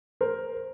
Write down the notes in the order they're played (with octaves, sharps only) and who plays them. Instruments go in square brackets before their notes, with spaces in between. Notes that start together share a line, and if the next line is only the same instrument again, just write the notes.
[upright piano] A#4 C5